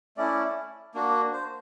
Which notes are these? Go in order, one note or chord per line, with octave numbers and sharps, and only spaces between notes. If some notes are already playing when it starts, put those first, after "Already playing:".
A3 C#4 E4 D5
A#3 D4 F#4
C5